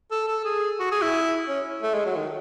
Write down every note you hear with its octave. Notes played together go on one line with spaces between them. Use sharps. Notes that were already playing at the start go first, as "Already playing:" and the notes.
A4
A4
G#4
F#4
G#4
E4
C#4
A3
G#3
F#3
D#3